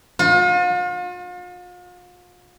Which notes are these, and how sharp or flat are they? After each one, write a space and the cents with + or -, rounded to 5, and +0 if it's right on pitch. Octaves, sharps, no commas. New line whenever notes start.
F4 +40